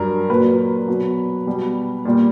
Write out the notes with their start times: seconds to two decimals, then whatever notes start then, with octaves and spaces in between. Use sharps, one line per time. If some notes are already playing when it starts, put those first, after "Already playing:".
Already playing: G2 F#3 A#4
0.30 A#2 F#3 B4
0.88 B2 F#3
1.47 B2 G3
2.05 A#2 G3